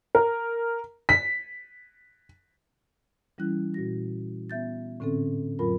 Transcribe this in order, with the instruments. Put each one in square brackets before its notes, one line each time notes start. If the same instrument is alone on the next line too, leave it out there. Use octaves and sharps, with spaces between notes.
[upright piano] A#4
B6
[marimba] E3 G3 C#4 E4 F#6
A#2 F#4 A#6
B3 E5 G6 A6
A2 D3 C4 C#4 A4
F2 A2 F#3 F4 A#4 B5